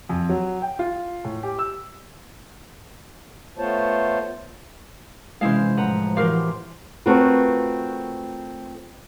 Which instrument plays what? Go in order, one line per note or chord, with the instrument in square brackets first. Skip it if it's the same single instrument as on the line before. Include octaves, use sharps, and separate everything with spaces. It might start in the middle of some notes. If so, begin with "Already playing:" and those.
[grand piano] F2
F#3
G5
F4
A2
G4
E6
[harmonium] A3 B3 F4 C5 C#5 A5
[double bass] C3 E3 [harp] G#3 C5 [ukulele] C#4 E4 F5
[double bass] A2 F3 [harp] B4 F#5 A#5
[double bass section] E3 [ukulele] F#4 A#4 F5 [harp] G4 C6
[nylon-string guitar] A3 C4 F4 F#4 A#4 B4